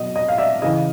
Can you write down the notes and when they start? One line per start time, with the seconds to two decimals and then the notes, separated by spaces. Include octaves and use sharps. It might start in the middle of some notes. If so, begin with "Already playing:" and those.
Already playing: B2 F#3 D#5
0.16 D#5
0.29 F5
0.38 D5 E5
0.62 C#3 E3 D#5 F5